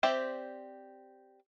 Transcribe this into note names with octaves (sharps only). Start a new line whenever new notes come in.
C4 G4 C5 D5 E5